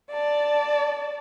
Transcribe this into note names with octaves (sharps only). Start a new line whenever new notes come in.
D5 A5